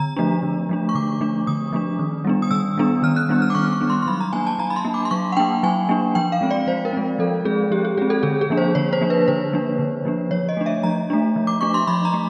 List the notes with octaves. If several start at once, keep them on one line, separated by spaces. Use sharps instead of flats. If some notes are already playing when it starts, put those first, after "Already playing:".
Already playing: D3 A#5
F3 A3 D4
D3
F3 A3 D4
C#6
D3 D6
F3 A3 D4
D3 D#6
F3 A3 D4
D#3
G3 B3 D4
D#6
D#3 E6
G3 B3 D4
D#3 F6
F#6
G3 B3 D4
F6
D6
D#3 C#6
C#6
G3 B3 D4
C6
C6
F#3 B5
A#5
A#3 D4 G#5
A5
F#3 A#5
B5
C6
A#3 D4
D6
C6
F#3 C#6
F#5
A#3 D4 G5
F#3 G#5
A#3 D4
F3 G5
F5
G#3 C4
D5
F3 C5
A#4
G#3 C4
F3 A4
G#3 C4 G#4
F3 G4
G4
G#3 C4 G#4
A4
D3 G#4
G#4
F3 A#3 D4
C5
D3 C#5
C5
F3 A#3 D4
B4
D3 C5
F3 A#3 D4
D3
F3 A#3 D4
F3 C#5
D#5
A3 D4
E5
F3 A#5
A3 D4
F3
D6
A3 D4 C#6
C6
F3 B5
A#5
A3